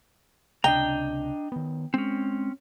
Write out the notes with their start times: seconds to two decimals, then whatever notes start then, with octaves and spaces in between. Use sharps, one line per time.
0.64 C#2 C3 D4 D#5 G5 A#5
1.52 D#3 B3
1.94 G#3 C4 C#4